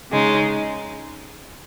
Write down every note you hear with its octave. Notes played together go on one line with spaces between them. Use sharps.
C#3 G#3 D#4